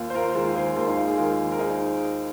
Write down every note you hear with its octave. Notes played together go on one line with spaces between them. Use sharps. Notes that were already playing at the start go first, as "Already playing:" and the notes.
Already playing: D#2 F4
C5
F4 A#4
D#3 G#3 F4 A#4
G#4 C5
D#2 F4 A#4
D#4
F4
G#4
D#3 G#3 F4 A#4
A#4
D#4 G#4